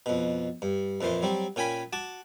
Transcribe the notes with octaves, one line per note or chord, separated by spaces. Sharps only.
F2 B2
G2
F2 A#2 E3 C5
F#3 G3 C4
A#2 C#4 G5 G#5 B5
F#4 A5 D6